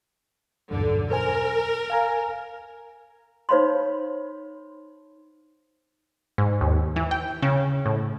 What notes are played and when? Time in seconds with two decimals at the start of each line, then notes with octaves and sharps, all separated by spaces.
0.71 B1 E2 G2 D3
1.11 A#4 C5 G#5
1.90 F5 G#5 A#5
3.49 D#4 C5 C#5 F5 B5 C6
6.38 G#2
6.61 D#2
6.96 E3
7.11 G5
7.43 C#3
7.86 A2